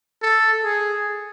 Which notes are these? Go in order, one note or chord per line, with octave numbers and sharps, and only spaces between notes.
A4
G#4